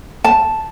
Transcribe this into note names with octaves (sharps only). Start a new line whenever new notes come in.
A5